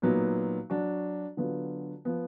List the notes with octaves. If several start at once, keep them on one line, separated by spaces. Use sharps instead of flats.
A#2 F#3 B3 D#4
F#3 D4 F#4
D3 F#3 B3 F4 B4
F3 B3